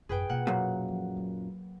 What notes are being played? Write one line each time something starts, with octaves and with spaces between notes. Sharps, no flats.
A1 F#2 G#4 B4 G5
B2 A#3 F4 F#5
F#2 A#2
F3
F#3